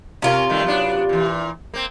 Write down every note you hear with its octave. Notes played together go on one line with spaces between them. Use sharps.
C3 C#4 F4 A#4
D#3 G3 A3
F#3 B3 D4
A#2 E3
A#3 C4